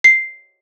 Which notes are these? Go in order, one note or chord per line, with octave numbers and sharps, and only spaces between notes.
C7